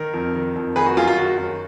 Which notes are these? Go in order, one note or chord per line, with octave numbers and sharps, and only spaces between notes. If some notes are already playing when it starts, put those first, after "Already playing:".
Already playing: D#3 A#4
F2
D#3
F2
D#3 G#4 B4
F#4
F#2 F4 G#4
F4
D#3 F#4
F#2